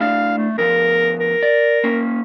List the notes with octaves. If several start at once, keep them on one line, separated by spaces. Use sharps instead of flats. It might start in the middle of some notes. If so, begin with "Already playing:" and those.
A2 D4 F5
A3
D2 F3 B3 A#4
A#4
D5
A#3 C#4